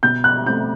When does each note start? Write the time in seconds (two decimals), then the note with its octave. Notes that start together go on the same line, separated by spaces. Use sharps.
0.03 B2 G6
0.24 F#6
0.46 A3 C4 G6